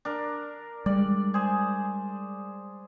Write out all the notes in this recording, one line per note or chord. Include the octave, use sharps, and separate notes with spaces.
D4 A#4
G3 G#3 D5
G#4 C5